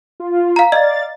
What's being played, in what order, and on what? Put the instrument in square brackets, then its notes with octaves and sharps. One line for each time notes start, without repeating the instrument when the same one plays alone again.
[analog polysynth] F4
[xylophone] F5 A#5
[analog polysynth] D5 F5 A6 [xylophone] D#5